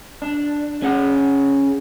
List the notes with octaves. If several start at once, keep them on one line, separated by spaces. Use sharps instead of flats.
D4
C#4 G#4 F#5